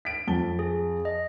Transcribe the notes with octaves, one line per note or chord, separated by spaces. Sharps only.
B6 D7
F2 A5 G7
G#4
D#5